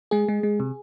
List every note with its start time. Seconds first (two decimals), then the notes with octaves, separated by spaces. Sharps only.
0.11 G#3 G#4
0.28 G#3
0.43 G#3
0.60 C3